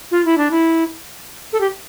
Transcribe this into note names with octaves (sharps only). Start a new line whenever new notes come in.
F4
E4
D4
E4
A4
G4